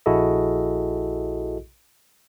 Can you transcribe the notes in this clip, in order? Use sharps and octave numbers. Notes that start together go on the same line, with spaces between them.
A#1 E4 F#4 G#4 A4 D#5